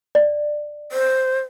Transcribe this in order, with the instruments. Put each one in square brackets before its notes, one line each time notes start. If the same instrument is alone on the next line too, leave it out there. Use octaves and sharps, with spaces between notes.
[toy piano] D5
[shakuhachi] C5